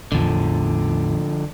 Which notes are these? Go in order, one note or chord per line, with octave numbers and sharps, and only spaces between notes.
A1 E2 D3 F3